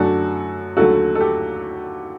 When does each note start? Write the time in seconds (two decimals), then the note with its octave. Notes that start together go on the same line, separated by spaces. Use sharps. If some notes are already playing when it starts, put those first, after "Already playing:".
Already playing: F#2 D3 F#3 A3 D4 F#4 A4
0.77 D#2 D3 F#3 A3 F#4 A4
1.15 A4
1.21 G4